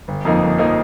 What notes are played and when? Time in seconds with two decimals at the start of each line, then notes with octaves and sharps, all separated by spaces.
0.08 G1
0.25 F2 F3 A#3 D#4
0.43 G1
0.58 F3 A#3 D#4